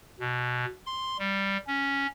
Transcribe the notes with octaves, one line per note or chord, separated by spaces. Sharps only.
B2
C6
G3
C#4